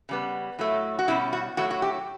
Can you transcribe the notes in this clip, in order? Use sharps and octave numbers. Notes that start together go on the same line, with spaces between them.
C#3 G3 B3
A2 F#3 A3
F#4
B2 G3 C#4 E4
F#4
A2 F#3 A3 F#4
F#4
G4